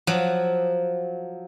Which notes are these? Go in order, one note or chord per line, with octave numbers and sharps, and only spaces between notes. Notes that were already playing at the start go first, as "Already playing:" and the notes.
F3 F#3